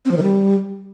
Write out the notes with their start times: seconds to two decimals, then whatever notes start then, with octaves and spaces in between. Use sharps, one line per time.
0.05 C4
0.11 F3
0.17 D#3
0.23 G3